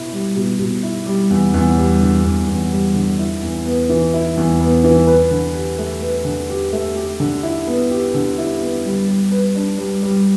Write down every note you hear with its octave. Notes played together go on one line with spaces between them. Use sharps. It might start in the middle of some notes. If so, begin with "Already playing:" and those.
Already playing: B2 E4
G3
B2
B2
E4
G3
E2
E2
G3
D3
E2
E2
G3
D3
E4
E2
B3
E3
E4
E2
B3
E3
B4
D3
G4
A3
B4
D3
G4
A3
G4
D3
E4
B3
G4
D3
E4
B3
G3
G3
B4
D4
G3
G3